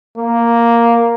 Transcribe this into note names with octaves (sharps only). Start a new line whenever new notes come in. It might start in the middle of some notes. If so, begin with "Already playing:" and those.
A#3